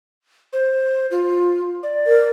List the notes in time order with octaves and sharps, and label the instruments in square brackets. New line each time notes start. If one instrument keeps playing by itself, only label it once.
[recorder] C5
F4
D5
[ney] A#4